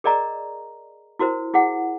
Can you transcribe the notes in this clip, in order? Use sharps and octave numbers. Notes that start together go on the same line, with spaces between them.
G#4 A#4 D5 D#5 A#5
E4 F#4 A#4 C5
E4 G#4 F#5